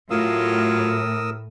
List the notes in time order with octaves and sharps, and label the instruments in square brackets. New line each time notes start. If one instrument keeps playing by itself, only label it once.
[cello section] A2 [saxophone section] F#3 F4 [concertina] A#4 D#6 E6